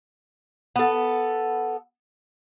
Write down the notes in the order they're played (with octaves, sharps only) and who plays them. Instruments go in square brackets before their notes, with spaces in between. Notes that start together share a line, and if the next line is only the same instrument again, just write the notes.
[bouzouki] B3 A4